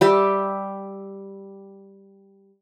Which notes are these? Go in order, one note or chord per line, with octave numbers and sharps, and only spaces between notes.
G3 G4 E5